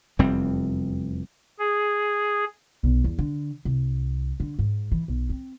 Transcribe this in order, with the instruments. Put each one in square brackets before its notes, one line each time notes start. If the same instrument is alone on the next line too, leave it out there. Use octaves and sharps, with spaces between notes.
[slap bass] F1 E2 G3 C4
[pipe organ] G#4
[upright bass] B1
E2
D3
C2
D3
G#2
E3
B1
C4